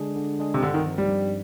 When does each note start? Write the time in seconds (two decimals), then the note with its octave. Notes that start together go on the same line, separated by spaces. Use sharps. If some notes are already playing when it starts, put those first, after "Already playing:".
Already playing: D3 G#3 D4 G#4
0.16 D3
0.39 G#3 D4 G#4
0.54 C3
0.62 G2 D3
0.74 D#3
0.85 F3 C4 D#4
0.98 G3
1.09 G2